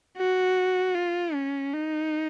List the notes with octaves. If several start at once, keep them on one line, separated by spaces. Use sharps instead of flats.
F#4
F4
C#4
D#4